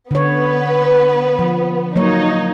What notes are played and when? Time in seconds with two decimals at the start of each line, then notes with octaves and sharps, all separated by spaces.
0.11 D3 B3 B4 C#5
1.39 F3
1.96 F#3 A#3 D#4 C#5